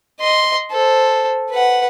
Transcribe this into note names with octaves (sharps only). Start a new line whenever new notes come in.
D#5 C6
A4 C5
B4 F#5